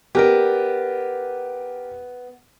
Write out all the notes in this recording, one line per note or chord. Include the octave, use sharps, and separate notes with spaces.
B3 G4 A#4 D5